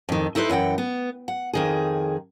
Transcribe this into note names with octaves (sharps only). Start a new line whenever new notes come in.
F2 D#3
D#4 E4 A4 B4 C5
F#2 E3 F#5 G5
B3
F#5
F2 D#3 G#4